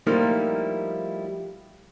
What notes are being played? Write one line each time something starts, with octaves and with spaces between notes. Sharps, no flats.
F3 G3 A3 A#3 D#4 E4